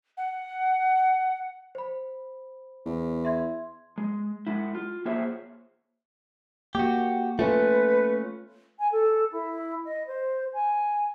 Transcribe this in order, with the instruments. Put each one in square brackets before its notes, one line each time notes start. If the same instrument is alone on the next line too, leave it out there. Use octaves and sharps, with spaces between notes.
[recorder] F#5
[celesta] C5 B5
[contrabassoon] E2
[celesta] E5 C6 G#6
[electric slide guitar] G#3
G#3 E4
F4
A#3 F4 G#4 C5 C#5 E5
[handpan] A#3 [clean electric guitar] F#4 G4
[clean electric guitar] A3 C#4 [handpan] F4 [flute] B4
[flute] G#5
A4
E4
D#5
C5
G#5